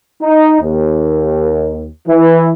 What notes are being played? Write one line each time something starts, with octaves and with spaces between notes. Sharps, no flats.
D#4
D#2
E3